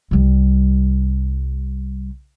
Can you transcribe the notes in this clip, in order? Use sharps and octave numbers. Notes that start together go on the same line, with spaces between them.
C2 G3